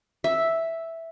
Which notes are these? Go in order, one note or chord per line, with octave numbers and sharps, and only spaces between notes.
E5